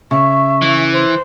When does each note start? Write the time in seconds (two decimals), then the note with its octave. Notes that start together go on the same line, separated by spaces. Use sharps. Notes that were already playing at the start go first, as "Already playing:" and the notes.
0.11 C#3 E5 C#6
0.62 E3
0.93 C5